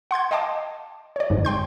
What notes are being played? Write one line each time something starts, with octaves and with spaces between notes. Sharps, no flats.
F#5 C6 G6 G#6
D#5 F5 G5 A5 D6
C#5 D5
G1 F2 G#2
G5 C6 G6